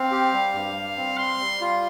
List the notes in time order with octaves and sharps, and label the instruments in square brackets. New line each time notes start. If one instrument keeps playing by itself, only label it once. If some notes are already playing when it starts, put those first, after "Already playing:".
Already playing: [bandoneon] C4 [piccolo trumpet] F5
[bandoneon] G4
G3
G2
G3
C4
[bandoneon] G3 [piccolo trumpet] C6
[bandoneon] G3
F4